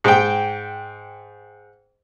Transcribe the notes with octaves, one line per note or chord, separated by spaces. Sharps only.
G#2 G5